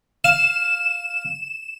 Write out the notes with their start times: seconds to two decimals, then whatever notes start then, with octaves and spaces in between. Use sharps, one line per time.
0.24 F5 E7